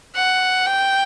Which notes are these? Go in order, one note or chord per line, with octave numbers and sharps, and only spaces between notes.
F#5
G5